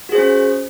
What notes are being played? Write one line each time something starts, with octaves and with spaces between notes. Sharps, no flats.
C#4 F#4 G#4 C5